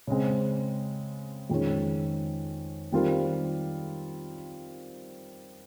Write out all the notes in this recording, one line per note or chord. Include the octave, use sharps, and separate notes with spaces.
C#3 G#3 C4
F2 D#3 G#3 C#4
D#3 G3 C4 F4 A#4